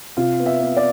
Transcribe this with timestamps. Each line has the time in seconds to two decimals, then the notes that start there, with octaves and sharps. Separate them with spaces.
0.17 C3 F4
0.40 B3
0.46 E5
0.61 B3
0.77 D5